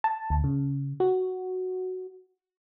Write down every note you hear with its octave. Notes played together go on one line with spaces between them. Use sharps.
A5
D2
C#3
F#4